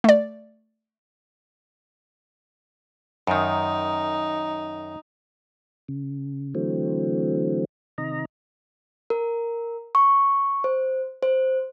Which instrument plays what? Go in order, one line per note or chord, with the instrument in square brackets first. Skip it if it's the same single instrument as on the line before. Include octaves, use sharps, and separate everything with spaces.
[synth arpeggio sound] A3 D5
[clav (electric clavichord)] F#2 D#3 [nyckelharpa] D#4
[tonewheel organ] C#3
D3 E3 F#3 A3 C4
C3 D#3 D#5 A#5
[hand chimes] A#4
C#6
C5
C5